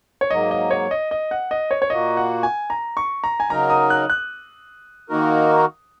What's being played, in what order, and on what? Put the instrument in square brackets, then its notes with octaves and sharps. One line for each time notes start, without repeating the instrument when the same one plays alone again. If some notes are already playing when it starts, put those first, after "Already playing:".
[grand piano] C#5
[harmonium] G#2 F#3 A#3 [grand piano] D#5
[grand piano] D#5
C#5
D#5
D#5
F#5
D#5
C#5
C#5
[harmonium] A#2 A#3 F#4 [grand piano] D#5
[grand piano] F#5
G#5
A#5
C#6
A#5
G#5
[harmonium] C#3 F#3 D#4 A#4 [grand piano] A#5
[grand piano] D#6
F#6
F#6
[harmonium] D#3 A#3 D#4 F#4 A#4